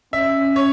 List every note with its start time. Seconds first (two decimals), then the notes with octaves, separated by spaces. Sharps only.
0.13 C#4 E5
0.56 C#5